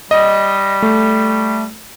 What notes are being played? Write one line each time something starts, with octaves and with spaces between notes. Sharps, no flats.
G3 D#5
A3